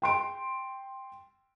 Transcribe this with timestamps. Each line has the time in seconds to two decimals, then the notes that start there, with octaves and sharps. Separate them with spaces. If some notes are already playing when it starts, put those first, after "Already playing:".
0.02 G5 C6 D7